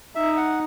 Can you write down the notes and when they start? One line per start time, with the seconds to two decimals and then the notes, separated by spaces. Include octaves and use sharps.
0.15 D#4 E5
0.37 F#5